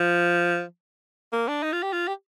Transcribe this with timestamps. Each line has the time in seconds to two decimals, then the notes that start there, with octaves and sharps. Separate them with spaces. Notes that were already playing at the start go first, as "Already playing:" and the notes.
Already playing: F3
1.32 A#3
1.48 D4
1.63 D#4
1.72 F4
1.82 G4
1.93 F4
2.08 G4